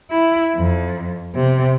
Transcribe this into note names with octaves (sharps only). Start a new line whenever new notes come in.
E4
F2
C3